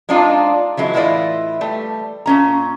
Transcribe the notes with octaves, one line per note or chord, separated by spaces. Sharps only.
G#3 C4 D4 D#4 F4
E3 F#3 G#3 E4
A2 E3 E4 F4 D5 D#5
G3 A3
A#2 C#4 A#5